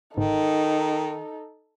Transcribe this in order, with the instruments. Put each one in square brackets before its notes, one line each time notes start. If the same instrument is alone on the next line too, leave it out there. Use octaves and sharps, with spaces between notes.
[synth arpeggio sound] G1 G#2 [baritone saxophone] D#3 [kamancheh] D#4 A4